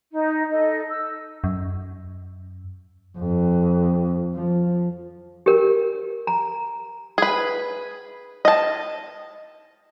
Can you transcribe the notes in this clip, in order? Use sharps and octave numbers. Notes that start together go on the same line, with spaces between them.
D#4
D#4 A4 D#5
E6
F#2
F2
F3
G4 A#4
A#5
G#4 B4
D#5 A5